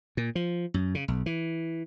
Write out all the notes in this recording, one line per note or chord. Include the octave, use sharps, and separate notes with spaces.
A#2
F3
F#2
C#3
B1
E3